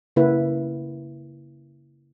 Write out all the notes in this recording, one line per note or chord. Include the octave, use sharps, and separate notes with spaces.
C#3 A#3 E4 B4